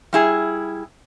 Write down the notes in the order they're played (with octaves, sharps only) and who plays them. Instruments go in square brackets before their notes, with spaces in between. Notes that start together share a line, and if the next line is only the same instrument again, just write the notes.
[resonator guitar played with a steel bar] G3 E4 G#4